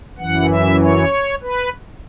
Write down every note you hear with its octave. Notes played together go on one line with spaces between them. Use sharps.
F#2 E3 F#5
E5
C#5
B4